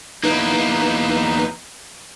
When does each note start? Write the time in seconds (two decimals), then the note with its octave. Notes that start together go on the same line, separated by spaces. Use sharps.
0.24 E2 A#3 D#4 B4